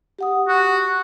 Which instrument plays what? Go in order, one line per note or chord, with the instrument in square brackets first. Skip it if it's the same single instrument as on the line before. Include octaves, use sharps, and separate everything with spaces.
[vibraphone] G4 F#5 D#6
[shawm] F#4